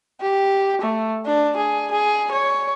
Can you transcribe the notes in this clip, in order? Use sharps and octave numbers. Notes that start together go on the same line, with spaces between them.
G4
A3
D4
G#4
G#4
C#5